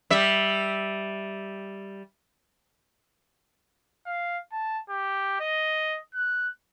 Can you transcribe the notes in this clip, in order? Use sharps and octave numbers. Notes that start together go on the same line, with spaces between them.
G3 E5
F5
A5
G4
D#5
F#6